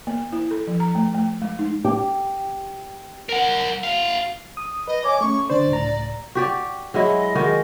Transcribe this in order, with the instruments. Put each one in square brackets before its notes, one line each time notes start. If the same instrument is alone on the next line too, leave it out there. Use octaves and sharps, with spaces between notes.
[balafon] A#3
E4
A4
F3
A#5
A3
A3
G#3
D#4
[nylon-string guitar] G4
[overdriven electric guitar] A#4 F#5
F#4 F5
[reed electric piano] D#6
[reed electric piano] B4 [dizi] D#5
[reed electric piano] C#5 G#5 [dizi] D6
[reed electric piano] A3 C#4 [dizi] C#6
[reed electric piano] D3 D4 C5 [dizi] D5
[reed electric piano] C#2 A2 A#5
[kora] F#4 G4 D5
[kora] F#3 G#3 E4 [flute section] D#5
[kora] D#3 G#3 F#4